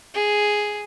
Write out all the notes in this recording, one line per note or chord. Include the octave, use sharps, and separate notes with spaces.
G#4